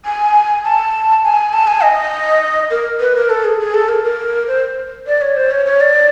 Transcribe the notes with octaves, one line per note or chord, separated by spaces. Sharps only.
G#5
A5
G#5
A5
G#5
D#5
A#4
B4
A#4
A4
G#4
G#4
A4
A#4
A#4
C5
D5
C#5
C5
C#5
C#5
D5